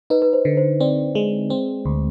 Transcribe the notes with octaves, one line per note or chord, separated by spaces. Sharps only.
D#4 B4
B4
C5
D3
C5
C4 D5
G#3
C4
D2